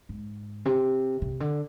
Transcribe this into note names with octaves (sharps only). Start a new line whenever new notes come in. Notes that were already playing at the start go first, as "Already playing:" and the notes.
G#2
C3
C3
D3